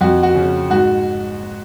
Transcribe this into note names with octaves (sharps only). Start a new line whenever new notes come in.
F2 F#4
F#4
C#3
G#2 F#4